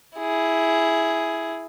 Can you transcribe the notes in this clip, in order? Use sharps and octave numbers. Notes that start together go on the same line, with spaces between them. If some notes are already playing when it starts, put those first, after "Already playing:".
E4 G#4